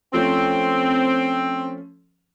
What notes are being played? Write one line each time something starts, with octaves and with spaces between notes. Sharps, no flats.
F3 A3 C4 C#4